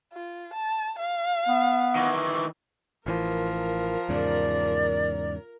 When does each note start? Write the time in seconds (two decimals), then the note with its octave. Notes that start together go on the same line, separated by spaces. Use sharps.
0.13 F4
0.54 A5
0.99 F5
1.48 B3
1.96 D#3 E3
3.06 A1 E3 F3 A#4
4.09 E2 G#2 C#3 D5